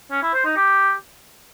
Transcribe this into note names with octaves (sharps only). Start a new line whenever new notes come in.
C#4
E4
C5
D#4
G4